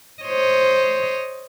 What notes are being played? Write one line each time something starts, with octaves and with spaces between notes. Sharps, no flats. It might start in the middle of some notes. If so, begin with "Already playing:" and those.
C5 C#5 D#5